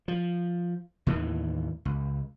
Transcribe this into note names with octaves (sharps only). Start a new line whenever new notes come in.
F3
D#2 A2 D#3 E3
C#2